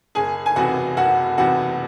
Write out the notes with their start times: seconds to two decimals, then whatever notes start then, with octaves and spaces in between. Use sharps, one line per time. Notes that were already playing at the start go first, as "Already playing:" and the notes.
0.15 F#1 G#4 G#5
0.46 G#5
0.56 E2 C3 F#4 F#5
0.97 F#1 F#4 F#5
1.38 E2 C3 F#4 F#5